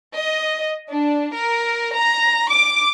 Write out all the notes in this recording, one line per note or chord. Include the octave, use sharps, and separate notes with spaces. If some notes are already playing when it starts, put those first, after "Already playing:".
D#5
D4
A#4
A#5
D6